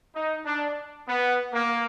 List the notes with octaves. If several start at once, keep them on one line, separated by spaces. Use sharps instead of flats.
D#4
D4
B3
A#3